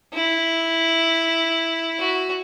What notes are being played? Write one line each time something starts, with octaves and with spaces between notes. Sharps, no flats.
E4
F#4